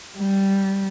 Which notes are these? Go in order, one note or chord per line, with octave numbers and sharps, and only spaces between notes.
G3